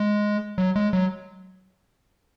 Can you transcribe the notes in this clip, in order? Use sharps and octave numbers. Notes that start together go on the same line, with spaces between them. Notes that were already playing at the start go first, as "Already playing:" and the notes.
Already playing: G#3
F#3
G#3
F#3